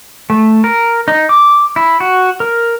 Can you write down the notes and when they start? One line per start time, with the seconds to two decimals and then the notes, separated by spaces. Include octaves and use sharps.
0.30 A3
0.64 A#4
1.08 D#4
1.29 D6
1.76 E4
2.00 F#4
2.40 A#4